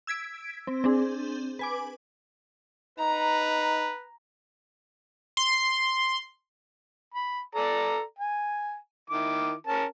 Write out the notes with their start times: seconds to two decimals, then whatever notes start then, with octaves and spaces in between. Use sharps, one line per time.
0.07 E6 G#6 B6 D7
0.67 C4
0.84 C4 D4 G#4
1.59 B4 G#5 D6
2.99 D#4 B4 A#5
5.37 C6
7.14 B5
7.55 A4 D5 A#5
8.19 G#5
9.10 D#3 E4 D6
9.67 C#4 A#4 A5